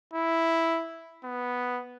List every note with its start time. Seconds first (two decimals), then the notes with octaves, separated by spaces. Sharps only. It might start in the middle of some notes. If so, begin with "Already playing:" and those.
0.13 E4
1.24 B3